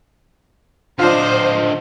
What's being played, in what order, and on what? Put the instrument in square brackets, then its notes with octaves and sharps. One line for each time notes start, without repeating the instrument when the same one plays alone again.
[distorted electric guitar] D3 D#5 [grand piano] D4 F4 [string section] C5